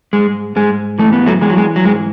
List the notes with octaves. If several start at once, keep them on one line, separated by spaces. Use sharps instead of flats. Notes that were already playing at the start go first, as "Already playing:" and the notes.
G#2 G#3
G#2 G#3
E3 A3
B3
F#3 A3
E3 G#3
F#3
G#3
F#3
G#2 G#3